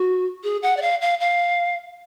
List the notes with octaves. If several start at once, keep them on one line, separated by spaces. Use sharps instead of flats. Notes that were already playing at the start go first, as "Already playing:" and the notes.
Already playing: F#4
G#4
F#5
D5
F5
F5
F5